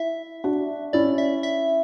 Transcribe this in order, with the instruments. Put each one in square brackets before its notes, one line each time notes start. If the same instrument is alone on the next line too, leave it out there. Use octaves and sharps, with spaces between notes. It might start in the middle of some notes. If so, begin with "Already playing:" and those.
Already playing: [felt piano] E4 [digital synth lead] E5
[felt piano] D4 F#4
[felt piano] C#4 E4 [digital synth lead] D5
[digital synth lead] E5
E5